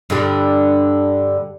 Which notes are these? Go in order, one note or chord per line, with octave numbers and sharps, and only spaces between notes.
G2 D3 G3